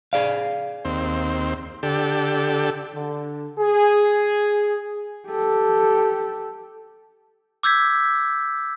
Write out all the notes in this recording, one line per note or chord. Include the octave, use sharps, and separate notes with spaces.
G#4 D5 F5
D#2 C4
D3 G4 A4
D3
G#4
G4 A4
D6 E6 G6 G#6 B6